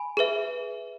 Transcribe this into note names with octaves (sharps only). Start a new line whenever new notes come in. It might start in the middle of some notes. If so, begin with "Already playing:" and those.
Already playing: G#5 B5
G#4 B4 E5